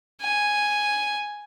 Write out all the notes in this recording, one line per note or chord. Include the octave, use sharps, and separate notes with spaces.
G#5